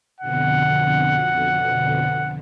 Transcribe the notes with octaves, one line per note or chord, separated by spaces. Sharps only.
F2 B2 D3 F#5